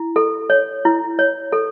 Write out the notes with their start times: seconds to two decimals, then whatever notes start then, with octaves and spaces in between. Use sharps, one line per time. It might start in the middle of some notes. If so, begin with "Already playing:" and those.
Already playing: E4
0.16 A4
0.50 C#5
0.85 E4
1.19 C#5
1.52 A4